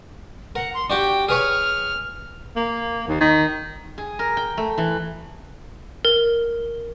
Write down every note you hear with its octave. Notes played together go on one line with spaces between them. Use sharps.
A#4 F#5
C6
D4 F#4 G4 G5
G#4 B4 C#5 F6
A#3
D#2
D#3
G#4
A#4
G5
A3
E3
A#4